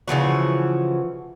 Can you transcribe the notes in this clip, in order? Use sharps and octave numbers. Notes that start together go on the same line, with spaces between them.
C#3 E3 F3 F#4